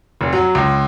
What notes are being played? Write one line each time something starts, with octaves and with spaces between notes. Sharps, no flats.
F1
F#3
C#2